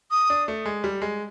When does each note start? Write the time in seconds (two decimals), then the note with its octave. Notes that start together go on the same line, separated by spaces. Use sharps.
0.11 D#6
0.30 D4
0.48 A3
0.65 G#3
0.84 G3
1.02 G#3